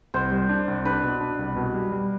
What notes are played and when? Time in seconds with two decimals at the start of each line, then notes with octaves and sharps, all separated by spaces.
0.14 C2 C5
0.32 G3
0.49 D4
0.68 C2
0.85 D4 B4
1.03 B2
1.21 D4
1.39 C2
1.56 B2
1.74 G3
1.92 G3